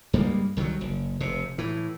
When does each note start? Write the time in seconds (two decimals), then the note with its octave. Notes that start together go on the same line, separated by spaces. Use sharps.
0.13 G2 G3 G#3 A#3
0.57 C2 D#3 F3 F#3
0.81 F#1
1.21 F1 C3
1.58 A2 E3